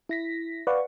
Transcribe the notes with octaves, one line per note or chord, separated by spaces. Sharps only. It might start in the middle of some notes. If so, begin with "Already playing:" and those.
E4 A#6 B6
B4 D5 F5 F#5 C#6